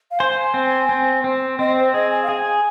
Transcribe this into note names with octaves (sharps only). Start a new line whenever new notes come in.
F5
C5 G#5
C4
C4
C4
C4 D#5
C5
G#4 D#5
G#5
F5
G#4 G#5